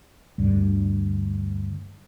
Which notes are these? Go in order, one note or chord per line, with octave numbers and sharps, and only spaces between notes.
D2 G2 D3